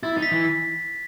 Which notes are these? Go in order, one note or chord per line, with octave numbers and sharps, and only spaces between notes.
E4 A6
D#4 A6
B6
E3